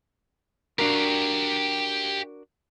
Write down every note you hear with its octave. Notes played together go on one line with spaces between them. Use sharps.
D4 F#4 G4 A#4 F5